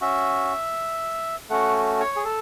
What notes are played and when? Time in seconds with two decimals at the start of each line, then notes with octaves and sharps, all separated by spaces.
0.01 C#4 F#4 E5
1.50 A3 C#4 F#4 F#5
2.00 C#5
2.16 G#4
2.25 A4